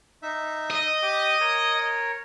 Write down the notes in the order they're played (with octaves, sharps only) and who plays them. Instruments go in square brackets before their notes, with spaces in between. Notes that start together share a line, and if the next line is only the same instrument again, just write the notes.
[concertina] D#4 E5
[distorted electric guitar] D#5
[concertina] G4 D6
A#4 C#5